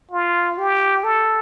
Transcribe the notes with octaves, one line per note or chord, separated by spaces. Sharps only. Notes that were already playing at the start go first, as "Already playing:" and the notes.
F4
G4
A4